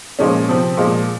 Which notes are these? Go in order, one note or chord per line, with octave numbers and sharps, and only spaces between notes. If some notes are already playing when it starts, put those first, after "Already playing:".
A#2 F3 G#3 C#4
C3 F3 C4
A#2 F3 G#3